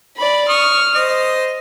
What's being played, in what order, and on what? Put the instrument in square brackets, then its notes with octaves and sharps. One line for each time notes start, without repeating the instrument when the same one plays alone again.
[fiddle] D5 B5
[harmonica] C#6 D#6 [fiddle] F6
[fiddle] C5 [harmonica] D#5